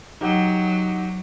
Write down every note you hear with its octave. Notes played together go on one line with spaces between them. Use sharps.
F#3 D#4 G4 F#5